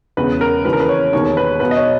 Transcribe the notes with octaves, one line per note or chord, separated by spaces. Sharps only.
E1 E2 C#3 B4
A#4
D#2 C#3 E3 B4
A#4
B4
C#5
E1 D#2 D#3 C#5
B4
B1 B2 B4
D#5
C#5